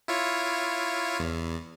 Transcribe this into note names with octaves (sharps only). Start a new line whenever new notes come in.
E4 F4 C#5
E2